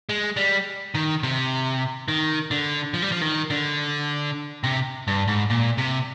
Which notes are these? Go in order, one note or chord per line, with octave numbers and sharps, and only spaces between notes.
G#3
G3
D#3
C3
D#3
D3
F3
G3
F3
D#3
D3
C3
G2
G#2
A#2
C3